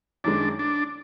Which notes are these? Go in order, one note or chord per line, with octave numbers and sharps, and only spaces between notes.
F#2 D#3 G#3 D4
D4